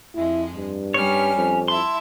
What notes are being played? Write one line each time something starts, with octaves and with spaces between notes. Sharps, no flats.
F2 G#3 E4
G2
G3 C#4 D4 C#5 F6
F2
E4 E5 A5 C6